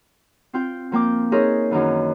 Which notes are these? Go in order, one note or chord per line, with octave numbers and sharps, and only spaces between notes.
C4 F4 G5
F3 A#3 G5 D6
D#4 G#4 A#4 C5 C#5 E5
F#2 D#3 E3